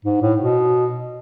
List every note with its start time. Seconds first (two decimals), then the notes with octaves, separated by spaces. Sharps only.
0.05 G#2
0.22 A2
0.39 B2